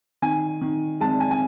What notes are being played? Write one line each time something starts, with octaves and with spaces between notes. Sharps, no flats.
D#3 G#5
D#3
G#3 A5
G#5
G#5